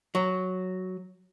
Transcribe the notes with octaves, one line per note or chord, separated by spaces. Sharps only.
F#3